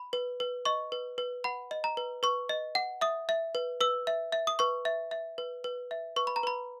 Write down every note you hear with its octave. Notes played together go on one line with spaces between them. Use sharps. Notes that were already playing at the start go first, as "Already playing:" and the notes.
Already playing: B5
B4
B4
D#5 C#6
B4
B4
F#5 B5
D#5
A#5
B4
B4 C#6
D#5
F#5
E5 D#6
E5
B4
B4 E6
E5
E5
D#6
B4 C#6
E5
E5
B4
B4
E5
B4 C#6
B5
A#5
B4 B5